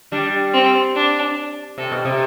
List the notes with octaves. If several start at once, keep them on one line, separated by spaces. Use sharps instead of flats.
G3 D4
C4
D4
C3 A4
B2
C3